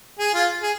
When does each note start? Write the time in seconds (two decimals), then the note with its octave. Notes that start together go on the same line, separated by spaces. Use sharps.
0.19 G#4
0.34 F4
0.63 G#4